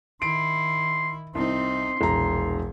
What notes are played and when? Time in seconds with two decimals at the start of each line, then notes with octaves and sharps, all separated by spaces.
0.22 D#3 E4 C6 D7
1.35 C2 C4 D#4 C6
2.01 E1 A#1 A#2 A#5